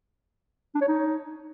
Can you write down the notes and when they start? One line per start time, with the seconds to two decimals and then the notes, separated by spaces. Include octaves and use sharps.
0.75 D4
0.81 C#5
0.88 D#4